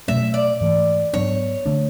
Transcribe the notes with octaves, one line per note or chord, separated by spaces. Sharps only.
B2 F#3 A3 C#4 E5
D5
G#2 E3 A3
G#2 F#3 B3 D4 C#5
D3 A3 D4